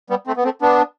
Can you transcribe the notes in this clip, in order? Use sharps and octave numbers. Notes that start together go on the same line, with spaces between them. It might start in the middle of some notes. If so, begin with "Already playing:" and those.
G3 B3
A3 C4
B3
A3 C4
B3 D4